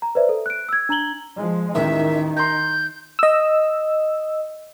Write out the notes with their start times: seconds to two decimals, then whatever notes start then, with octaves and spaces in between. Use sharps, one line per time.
0.02 A#5
0.15 B4 C5 D5 E5
0.29 A4
0.46 F#6 D7
0.69 E6 G#6
0.89 D4 A#5 G#6 F#7 G7
1.36 F3 G#3
1.75 A1 D#2 D#3 E5
2.37 A#5 C6 G6
3.19 D#5 E6